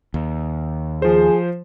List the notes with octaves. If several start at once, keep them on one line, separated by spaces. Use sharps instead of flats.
D#2
F3 G#4 C5